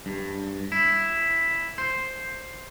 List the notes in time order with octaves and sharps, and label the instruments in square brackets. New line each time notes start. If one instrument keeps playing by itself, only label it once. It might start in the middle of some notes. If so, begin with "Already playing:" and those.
[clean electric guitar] G2
E4
C5